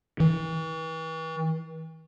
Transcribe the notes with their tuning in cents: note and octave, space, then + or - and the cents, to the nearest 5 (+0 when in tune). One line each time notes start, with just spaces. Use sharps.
E3 -35